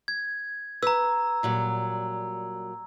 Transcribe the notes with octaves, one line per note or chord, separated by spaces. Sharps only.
G#6
B4 A#5 E6
A#2 F#3 G3